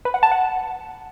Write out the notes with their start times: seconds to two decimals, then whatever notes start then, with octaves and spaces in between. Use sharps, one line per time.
0.05 B4
0.14 F#5
0.23 A5
0.31 F#5